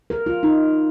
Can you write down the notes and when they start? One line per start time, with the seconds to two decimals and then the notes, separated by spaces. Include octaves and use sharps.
0.10 A#4
0.26 F4
0.43 D#4